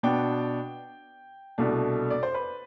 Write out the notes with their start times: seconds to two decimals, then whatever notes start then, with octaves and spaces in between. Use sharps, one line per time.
0.03 B2 B3 D4 G5
1.58 C2 B2 A3 D4
2.10 D5
2.23 C5
2.34 B4